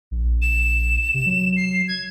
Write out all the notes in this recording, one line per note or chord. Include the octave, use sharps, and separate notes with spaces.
A#1
E7
C3
F#3
C7
G#6